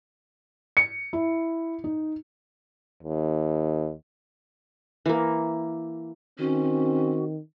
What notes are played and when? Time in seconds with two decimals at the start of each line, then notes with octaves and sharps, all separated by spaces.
0.77 C#7
1.13 E4
1.84 D#4
3.03 D#2
5.06 E3 A#3
6.39 D#3 C4 C#4 F#4